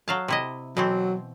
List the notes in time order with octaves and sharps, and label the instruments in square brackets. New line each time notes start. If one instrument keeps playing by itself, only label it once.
[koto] F#3 F5 A5
C3 E4 D#5
[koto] B2 E3 C4 [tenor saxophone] F#3